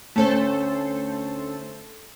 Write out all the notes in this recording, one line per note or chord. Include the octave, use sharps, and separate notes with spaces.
D2 A3 C#4 A4 C5